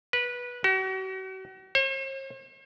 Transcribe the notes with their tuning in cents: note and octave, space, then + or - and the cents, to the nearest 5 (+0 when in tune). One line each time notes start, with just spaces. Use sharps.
B4 -15
F#4 +40
C5 +45